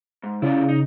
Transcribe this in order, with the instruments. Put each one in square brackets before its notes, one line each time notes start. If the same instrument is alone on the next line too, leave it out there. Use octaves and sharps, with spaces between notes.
[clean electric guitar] G#2
[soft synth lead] C#3 [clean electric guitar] E4 F4 D5
[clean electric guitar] D#4